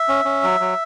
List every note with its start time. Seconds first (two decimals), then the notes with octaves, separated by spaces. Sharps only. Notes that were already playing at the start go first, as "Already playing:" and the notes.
Already playing: E5
0.08 C#4
0.25 C#4
0.43 F#3
0.60 F#3